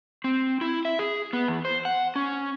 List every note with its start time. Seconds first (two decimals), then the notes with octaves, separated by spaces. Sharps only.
0.24 C4
0.61 E4
0.85 E5
0.99 G#4
1.33 B3
1.48 E2
1.65 C5
1.85 F#5
2.16 C#4